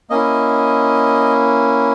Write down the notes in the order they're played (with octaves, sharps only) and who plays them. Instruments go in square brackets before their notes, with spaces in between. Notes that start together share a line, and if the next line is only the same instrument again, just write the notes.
[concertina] A#3 C#4 E4 D#5